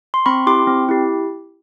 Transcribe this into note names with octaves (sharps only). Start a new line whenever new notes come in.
C6
C4 B5 C#6
E4 G4 C6 D6
C4
E4 G4